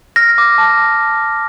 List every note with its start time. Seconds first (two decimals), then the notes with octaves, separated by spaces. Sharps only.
0.16 F6 A#6
0.38 D6
0.58 A5